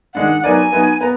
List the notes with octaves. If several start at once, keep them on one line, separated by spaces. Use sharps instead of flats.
D#3 G#3 D4 F#5
F#3 B3 D#4 A#4 D5 G#5
F#3 B3 D#4
B3 A#5